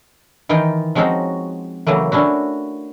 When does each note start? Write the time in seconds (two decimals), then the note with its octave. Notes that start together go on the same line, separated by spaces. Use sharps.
0.49 D#3 E3 D#4 F4 G5
0.95 F3 G#3 C4 C#4 D#4 F#4
1.87 C#3 E3 F#3 A3 A#3
2.12 C#4 D4 E4 F#4